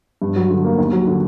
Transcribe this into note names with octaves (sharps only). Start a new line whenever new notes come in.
G2
F#3
D3
A#3
D#2
F#3
D3